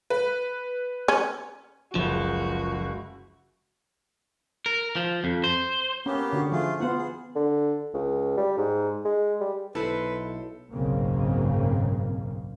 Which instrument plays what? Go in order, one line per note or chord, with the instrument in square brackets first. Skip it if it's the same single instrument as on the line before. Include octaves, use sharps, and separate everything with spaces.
[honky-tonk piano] B4
[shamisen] C#4
[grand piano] F#1 C#2 [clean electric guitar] F3 [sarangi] F#4
[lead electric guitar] A#4
F3
F2
C5
[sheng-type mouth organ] A#3 B3 G4 [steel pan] C#4
[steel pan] D3 F#4
[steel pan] F3 [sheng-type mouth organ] A3 F4 G#4
[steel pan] B3 F4 [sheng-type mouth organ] C5 F#5
[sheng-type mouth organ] G#4
[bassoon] D3
C#2
G3
G#2
G#3
G3
[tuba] B1 [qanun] E4 C5 [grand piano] A4 [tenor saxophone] B4
[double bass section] F#1 B1 G#2 C#3 A#3 C4